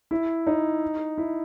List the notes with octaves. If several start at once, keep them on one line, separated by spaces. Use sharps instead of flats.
E4
D#4
E4